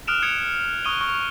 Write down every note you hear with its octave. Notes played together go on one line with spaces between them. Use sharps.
D#6 F6 F#6 D7 E7 F7
D#6 G#6 C#7 D7 F7
C#6 D#6 F#6 D#7 F7 G7
C#6